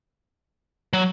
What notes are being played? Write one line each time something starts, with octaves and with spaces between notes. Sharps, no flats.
F#3